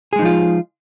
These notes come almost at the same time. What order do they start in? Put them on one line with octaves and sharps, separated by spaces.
G#4 G#3 D#4 F3 F4